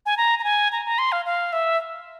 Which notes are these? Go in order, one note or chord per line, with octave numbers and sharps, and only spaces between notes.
G#5
A#5
A#5
G#5
A#5
A#5
C6
F5
F5
E5